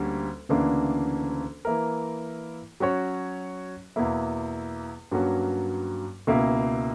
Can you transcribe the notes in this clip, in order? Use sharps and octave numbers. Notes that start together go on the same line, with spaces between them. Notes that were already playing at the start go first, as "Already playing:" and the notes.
Already playing: D2 D3 G3 A#3 C#4
D2 C#3 E3 A#3 D4
E3 A#3 E4 A#4
F#3 C#4 F#4 C#5
E2 B2 A#3 E4
G2 F#3 A#3 C#4 F#4
C#2 B2 A#3 E4